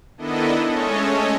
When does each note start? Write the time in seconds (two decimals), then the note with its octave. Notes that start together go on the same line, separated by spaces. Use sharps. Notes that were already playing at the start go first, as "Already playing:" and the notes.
0.18 D#3 B3 D4 E4 A4 D#5
0.69 G#3 A3 C#4 A4 C#5 D#5